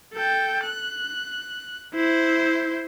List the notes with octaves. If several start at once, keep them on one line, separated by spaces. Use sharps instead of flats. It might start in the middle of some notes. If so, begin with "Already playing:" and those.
A4 G5
F#6
E4 C5